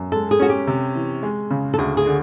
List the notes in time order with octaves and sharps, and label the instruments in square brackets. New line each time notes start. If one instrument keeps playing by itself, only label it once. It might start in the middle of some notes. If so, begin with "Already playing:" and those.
Already playing: [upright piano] F#2
[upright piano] G#3 [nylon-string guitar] A4
[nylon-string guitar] G#4
[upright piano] C#4 [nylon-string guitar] F#4
[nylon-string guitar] G4
[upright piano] C3
E3
G#3
C#3
[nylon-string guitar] A4
[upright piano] D2 [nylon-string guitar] G#4
[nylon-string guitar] G#4
[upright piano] D3